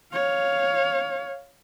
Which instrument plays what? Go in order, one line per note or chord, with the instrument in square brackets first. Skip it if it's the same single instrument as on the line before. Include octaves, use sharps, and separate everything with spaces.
[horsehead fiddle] C#5 F5